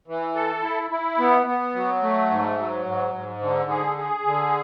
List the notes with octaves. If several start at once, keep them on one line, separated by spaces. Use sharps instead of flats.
E3
A4
E4
E4
B3
B3
F#3
A3
G#2
F#3
G#2
G#2
D3
G#4
G#4
D3